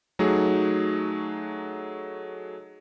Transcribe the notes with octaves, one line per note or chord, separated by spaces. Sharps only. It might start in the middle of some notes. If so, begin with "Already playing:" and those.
F#3 A3 D#4 F#4 G#4